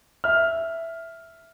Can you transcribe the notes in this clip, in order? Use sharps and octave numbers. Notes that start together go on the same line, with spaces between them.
E5 F6